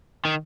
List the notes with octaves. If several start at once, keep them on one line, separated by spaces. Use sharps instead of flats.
D#3